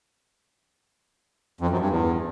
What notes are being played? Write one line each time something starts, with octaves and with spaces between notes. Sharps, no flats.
F2
F#2
G2
E2